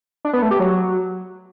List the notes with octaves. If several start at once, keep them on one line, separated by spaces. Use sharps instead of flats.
D4
B3
A3
G4
F#3